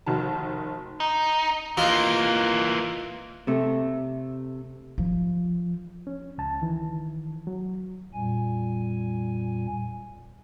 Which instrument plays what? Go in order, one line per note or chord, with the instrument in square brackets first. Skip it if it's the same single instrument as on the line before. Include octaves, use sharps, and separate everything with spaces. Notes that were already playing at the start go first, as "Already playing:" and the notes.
[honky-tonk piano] F1 D#3 F#4 A5
[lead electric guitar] D#4
[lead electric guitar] E3 A#3 [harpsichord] F4 D#5
[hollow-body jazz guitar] C3 A3
[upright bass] F3
[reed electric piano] C#4
C#2 A5
D#3 E3
F#3
[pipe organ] F2 A#2 G3 G#5